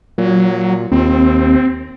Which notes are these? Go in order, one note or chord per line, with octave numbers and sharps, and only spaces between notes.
A#2 F#3
D#2 C4